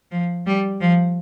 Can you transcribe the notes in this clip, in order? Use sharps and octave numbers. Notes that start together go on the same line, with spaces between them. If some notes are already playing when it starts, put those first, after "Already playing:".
F3
G3
F3